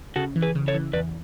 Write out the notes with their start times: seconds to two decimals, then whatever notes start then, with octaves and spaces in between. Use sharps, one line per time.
0.16 C#3 F#4 A4
0.36 E3
0.42 G#4 B4
0.55 C#3
0.68 A4 C#5
0.74 E3
0.93 E2 B4 D5